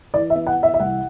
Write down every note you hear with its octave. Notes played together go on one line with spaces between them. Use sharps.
E3 D5
E5
B3
F#5
E3
E5
E5
C2 F#5